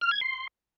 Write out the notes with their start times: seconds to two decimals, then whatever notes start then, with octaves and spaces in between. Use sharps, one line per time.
0.01 F6
0.11 G#6
0.21 C6